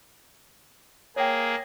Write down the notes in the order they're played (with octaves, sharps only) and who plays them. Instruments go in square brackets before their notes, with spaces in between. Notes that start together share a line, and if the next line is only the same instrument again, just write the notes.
[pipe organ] A#3 G#4 [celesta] C#5 G5